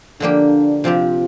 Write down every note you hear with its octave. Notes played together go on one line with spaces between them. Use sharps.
D3 F3 A#3 D4 G4
C3 F3 C4 F4 G4